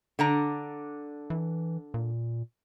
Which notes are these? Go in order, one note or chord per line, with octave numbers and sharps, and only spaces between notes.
D3 D4 A#5
E3
A#2